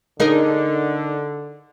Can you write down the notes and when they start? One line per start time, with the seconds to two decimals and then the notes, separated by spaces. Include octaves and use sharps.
0.20 D3 D#4 G#4 A#4